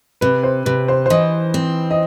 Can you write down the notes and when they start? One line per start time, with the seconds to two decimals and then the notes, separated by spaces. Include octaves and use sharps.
0.21 C3 B4
0.43 C5
0.66 C3 B4
0.88 C5
1.06 C5
1.10 E3 D#5
1.54 C4
1.91 D#5